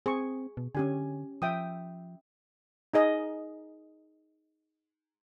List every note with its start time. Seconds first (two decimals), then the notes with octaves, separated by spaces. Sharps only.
0.06 C4 G#4 C#6
0.57 B2
0.75 D3 C#4 G4 G#5
1.42 F3 E5 G5 D#6
2.94 D#4 G#4 D#5